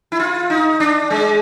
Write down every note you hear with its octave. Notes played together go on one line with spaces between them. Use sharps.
E4
F4
D#4
D4
G#3